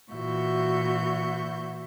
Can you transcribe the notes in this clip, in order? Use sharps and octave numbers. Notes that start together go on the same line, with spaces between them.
A#2 E3 F#4 E5 C#6 G6